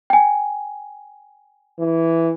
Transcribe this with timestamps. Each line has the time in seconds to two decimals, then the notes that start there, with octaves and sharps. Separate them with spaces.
0.10 G5 G#5
1.79 E3